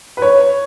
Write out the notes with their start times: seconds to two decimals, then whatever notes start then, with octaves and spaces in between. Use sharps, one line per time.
0.17 B4
0.22 C#5